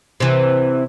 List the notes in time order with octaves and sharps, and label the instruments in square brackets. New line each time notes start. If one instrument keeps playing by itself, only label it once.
[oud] C3 E3